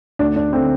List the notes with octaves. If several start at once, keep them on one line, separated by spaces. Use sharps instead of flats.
D2 D4
D4
D3 A3 C4